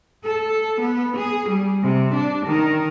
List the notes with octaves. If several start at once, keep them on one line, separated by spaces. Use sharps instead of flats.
A4
B3
G#4
G3
C3
D4
D#3